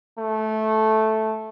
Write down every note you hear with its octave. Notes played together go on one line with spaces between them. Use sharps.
A3